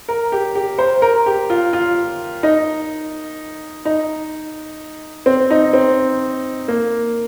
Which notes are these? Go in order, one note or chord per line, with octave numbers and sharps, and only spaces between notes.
A#4
G4
G4
C5
A#4
G4
F4
F4
D#4
D#4
C4
D#4
C4
A#3